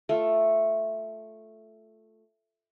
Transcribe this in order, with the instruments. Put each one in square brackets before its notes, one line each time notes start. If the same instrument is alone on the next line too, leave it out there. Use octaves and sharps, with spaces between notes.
[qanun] A3 F4